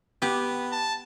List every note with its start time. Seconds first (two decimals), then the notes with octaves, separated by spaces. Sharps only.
0.22 B3 G4
0.72 A5